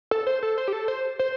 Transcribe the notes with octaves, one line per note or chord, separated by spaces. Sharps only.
A4
C5
A4
C5
G4
A4
C5
C5